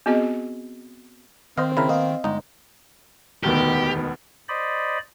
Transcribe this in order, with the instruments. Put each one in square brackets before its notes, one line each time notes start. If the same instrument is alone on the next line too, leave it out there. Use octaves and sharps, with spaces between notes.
[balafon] B3 C4 F#4 G#4 D#5
[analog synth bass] D#3 [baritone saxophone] C4 [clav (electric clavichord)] C5 D#5 F5
[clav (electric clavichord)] C#3 E4 A#4 [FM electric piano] B5
[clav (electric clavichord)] A#3 B3 [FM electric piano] D#5 F5
[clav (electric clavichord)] G1 D#4 [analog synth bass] G#3
[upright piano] E1 D2 [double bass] D#3 B3 [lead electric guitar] G4
[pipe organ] C5 D5 D#5 B5